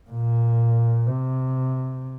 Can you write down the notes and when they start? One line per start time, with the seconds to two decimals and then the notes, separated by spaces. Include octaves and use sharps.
0.10 A#2
1.07 C3